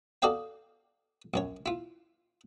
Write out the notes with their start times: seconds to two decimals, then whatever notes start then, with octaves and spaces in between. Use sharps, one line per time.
0.22 F#4 A4 D5 D#5 F5 G5
1.34 A#1 F#2 C#5
1.66 E4 F4